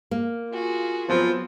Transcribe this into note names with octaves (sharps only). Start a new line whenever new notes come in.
A#3
F4 F#4 G#4
F3 F#3 B3 C4